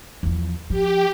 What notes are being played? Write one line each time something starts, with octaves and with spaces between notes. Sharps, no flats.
E2 F3
F3 G4